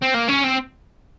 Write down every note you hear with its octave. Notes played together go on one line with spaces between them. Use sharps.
C4
A#3
C#4
C4